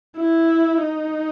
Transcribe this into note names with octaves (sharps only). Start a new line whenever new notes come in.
E4
D#4